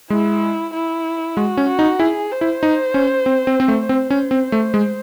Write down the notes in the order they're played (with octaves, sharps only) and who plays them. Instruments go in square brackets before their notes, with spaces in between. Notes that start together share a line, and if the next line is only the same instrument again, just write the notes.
[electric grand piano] G#3 [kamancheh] E4
[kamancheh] E4
[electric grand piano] G#3 [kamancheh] F#4
[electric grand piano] C#4
[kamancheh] F#4
[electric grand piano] D#4
[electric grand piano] E4 [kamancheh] G#4
[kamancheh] C5
[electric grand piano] E4
D#4
C#4
C4
C4
C4
A3
[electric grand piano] C4 [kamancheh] C5
[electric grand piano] C#4
C4
A3
G#3